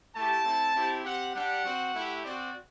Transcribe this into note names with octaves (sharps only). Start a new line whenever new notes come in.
A3 E4 G4 A5
A3 C4 E4
C4 E4 G4
C4 G4 F#5
G3 D4 G4 F#5
C4 F#4
A3 E4 G4
C4 F#4 D5